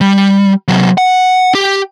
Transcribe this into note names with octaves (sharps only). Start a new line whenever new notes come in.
G3
C3 F#3
F#5
G4